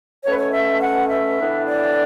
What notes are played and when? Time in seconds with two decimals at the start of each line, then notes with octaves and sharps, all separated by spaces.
0.24 B2 A3 C#4 C#5
0.31 B4
0.38 C#5
0.52 E5
0.81 F#5
1.09 E5
1.37 A2 E3 B3 D4
1.66 D5